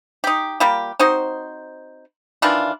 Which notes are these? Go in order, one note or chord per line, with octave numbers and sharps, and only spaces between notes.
D#4 G4
G3 A#3 F4 G4
C4 D#4 F#4 C5
D#3 E3 D4 F4